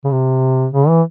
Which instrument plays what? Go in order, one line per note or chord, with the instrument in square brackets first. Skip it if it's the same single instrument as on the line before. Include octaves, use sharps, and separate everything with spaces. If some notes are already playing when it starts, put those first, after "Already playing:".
[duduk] C#3
C3
C#3
E3